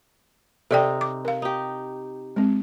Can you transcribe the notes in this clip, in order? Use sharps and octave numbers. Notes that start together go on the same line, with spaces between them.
C3 D#4 A4 D5 G5
D6
A#4 F5
D#4 G4
G#3 C4